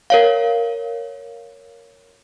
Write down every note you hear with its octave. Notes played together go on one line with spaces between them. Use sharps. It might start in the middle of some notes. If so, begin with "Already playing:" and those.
A#4 C#5 F5